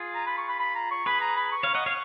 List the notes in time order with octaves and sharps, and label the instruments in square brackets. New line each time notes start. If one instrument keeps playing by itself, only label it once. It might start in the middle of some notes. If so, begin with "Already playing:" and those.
Already playing: [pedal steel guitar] F4 G#4
[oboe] A#5
B5
C#6
B5
B5
A#5
C#6
[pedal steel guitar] G#4 B4 [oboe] B5
[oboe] A#5
B5
C#6
[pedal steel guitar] C#5 F5
D#5 F#5
C#5 F5